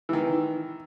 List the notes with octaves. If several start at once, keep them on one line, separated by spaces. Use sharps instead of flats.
D#3 E3